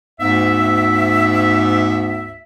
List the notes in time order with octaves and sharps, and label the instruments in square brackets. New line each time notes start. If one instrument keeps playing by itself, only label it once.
[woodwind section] D2 G#2 B3 E5